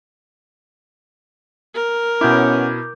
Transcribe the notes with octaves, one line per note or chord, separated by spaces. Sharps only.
A#4
B2 B3 C#4 E4 D6 G6